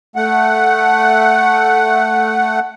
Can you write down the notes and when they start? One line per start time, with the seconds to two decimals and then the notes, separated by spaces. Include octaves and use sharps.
0.16 A3 F#5